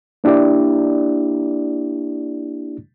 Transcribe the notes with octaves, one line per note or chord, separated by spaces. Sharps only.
A#3 D4 E4 G4 D5